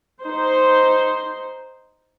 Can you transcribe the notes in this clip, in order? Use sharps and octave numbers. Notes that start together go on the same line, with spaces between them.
D#4 C5